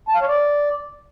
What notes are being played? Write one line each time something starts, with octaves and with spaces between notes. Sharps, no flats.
A5
F5
C#5
D5